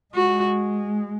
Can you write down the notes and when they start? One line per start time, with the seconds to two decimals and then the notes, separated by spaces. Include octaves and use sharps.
0.15 G#3 F#4